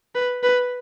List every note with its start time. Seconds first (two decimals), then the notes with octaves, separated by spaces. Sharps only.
0.15 B4
0.43 B4